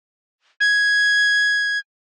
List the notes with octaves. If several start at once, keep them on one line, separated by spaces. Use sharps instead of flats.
G#6